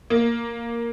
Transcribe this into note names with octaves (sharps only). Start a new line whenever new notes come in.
A#3